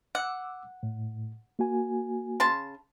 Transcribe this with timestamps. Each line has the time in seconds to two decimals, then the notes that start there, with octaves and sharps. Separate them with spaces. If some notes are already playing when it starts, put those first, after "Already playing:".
0.15 F#5 D6 E6
0.83 A2
1.59 A#3 F#4 G#5
2.40 C#3 A5 C6